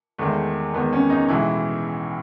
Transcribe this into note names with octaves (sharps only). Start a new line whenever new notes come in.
E2 D#3 G#3 A3
E2 D#3 G#3 B3
C#4
D#4
B1 A2 E3 G#3 E4